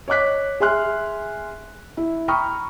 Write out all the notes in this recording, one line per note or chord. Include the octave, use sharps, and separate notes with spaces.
C#5 D#5 D6 F#6 B6
G#4 E5 G#5 C6 F6 F#6
E4
G5 A#5 B5 C#6 D#6 F6